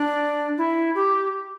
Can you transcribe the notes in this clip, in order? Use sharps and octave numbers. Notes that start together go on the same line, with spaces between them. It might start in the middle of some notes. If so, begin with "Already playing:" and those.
Already playing: D4
E4
G4